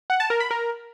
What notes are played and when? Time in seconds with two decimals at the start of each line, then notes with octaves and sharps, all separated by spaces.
0.10 F#5
0.20 A5
0.30 A#4
0.40 B5
0.51 A#4